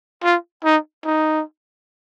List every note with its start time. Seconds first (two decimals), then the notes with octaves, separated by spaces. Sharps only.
0.23 F4
0.64 D#4
1.05 D#4